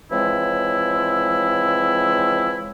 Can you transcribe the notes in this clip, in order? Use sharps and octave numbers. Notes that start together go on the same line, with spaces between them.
C#3 E3 F3 G#3 C4 E4